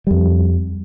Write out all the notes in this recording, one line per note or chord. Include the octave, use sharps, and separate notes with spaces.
F2 G3